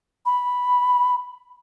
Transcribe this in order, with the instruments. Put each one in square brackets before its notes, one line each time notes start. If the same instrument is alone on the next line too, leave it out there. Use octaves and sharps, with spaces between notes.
[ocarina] B5